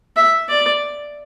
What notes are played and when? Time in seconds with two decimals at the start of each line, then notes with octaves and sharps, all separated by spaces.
0.17 E5
0.49 D5